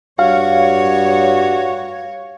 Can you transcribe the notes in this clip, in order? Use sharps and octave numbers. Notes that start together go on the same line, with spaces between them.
G2 F#4 C#5 F5